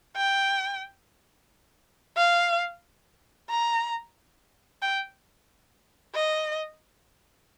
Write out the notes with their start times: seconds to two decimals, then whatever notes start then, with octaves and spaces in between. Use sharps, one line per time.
0.17 G5
2.17 F5
3.49 A#5
4.82 G5
6.15 D#5